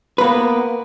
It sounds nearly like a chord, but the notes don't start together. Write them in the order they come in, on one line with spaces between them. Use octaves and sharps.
B4 A#3 B3